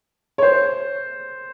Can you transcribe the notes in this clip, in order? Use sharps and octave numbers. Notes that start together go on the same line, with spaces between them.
C#5
C5